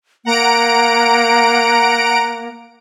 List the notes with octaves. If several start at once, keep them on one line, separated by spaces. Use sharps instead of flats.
A#3 F#5 A#5 D7